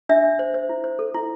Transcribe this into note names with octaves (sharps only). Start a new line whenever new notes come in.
D4 E5
D4
C5
C5
E4
C5
A4
E4